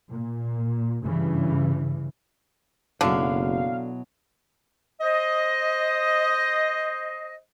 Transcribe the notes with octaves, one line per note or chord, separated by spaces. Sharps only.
A#2
G2 C#3 E3
F#1 B2 D3 F#3 E4 F5
C5 D#5